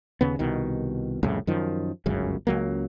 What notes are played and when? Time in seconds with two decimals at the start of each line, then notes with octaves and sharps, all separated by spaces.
0.21 D#2 C#3 B3
0.39 C2 B2 D#3
1.23 C2 F2 A2 C#3
1.47 F#2 D#3 F3
2.06 G1 C#2 F#2 C#3
2.47 C#2 F#3 A#3